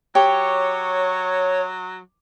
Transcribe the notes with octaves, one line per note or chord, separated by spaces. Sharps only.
F#3 G4 C#5